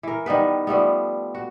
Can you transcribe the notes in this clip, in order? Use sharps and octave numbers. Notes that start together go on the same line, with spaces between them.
E3 A#4
D#3 G3 B3 B4
F3 G3 A3 B3
F#4